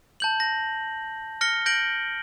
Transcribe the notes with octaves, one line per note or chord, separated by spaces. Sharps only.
A5 G6 F#7
A#6
F6 A#6 C#7 G7
G6 A#6 D7 F#7